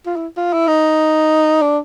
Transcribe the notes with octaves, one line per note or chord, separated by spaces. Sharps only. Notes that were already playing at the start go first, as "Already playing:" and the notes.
F4
E4
F4
E4
D#4
D4